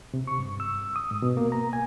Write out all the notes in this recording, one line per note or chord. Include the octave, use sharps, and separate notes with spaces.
C3
C#6
G2
E6
D#6
G#2
B2
A#3
A#5
G#5